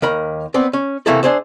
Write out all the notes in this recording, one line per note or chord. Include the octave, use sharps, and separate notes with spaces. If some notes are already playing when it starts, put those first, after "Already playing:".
D#2 A#4 B5
B3 C4 D5
C#4
C3 E3 A3 A#3 E4 A4
D4 D#4 G#4 C5 E5